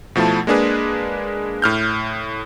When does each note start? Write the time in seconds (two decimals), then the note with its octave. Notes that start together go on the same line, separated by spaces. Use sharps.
0.16 B2 F3 A3 E4 A5
0.47 G#3 A#3 D4 G#4 B4
1.62 A2 F6 G6